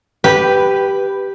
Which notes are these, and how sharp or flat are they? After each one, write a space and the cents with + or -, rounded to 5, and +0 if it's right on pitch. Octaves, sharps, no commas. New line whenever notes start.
G4 +0 B4 +0